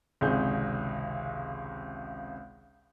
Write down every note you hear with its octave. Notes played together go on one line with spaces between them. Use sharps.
G#1 C#2 C3 G#4 G6